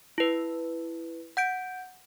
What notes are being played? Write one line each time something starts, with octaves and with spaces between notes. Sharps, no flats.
E4 B4
F#5 G6 D7